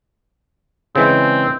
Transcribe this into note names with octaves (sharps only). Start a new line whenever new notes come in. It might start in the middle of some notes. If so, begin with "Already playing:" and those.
C#3 E3 G#3 C4